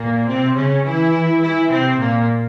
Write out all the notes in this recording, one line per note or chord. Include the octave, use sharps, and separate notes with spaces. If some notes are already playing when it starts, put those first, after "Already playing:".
Already playing: A#2 A#3
C3 C4
C#3 C#4
E3 E4
E3 E4
C3 C4
A#2 A#3